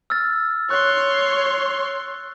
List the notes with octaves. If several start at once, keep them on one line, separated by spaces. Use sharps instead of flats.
E6 F6 A6
C#5 C6 C#6 F#6